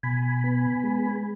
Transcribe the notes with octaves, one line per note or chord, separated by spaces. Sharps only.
B2 G#5 B5
B3
G#3